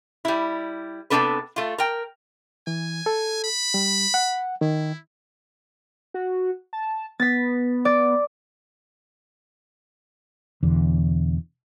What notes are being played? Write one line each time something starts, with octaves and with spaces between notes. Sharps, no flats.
G3 E4
C3 A3 B3 D4 A4 B4
A3 F4
A#4 G5
E3 G#5
A4
B5
G3
F#5
D#3 E4
F#4
A5
B3 A6 B6
D5
E1 E2 D3